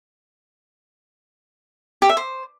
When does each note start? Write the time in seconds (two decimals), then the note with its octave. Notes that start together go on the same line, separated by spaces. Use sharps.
2.02 G4
2.09 E5
2.17 C5